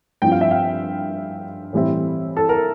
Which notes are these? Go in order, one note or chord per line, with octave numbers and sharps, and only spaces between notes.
G2 F3 C4 F4 G5
F5
E5
F5
A2 E3 G3 C4 E4
A4
A#4